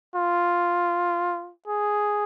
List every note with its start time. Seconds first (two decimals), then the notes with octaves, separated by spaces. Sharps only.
0.15 F4
1.67 G#4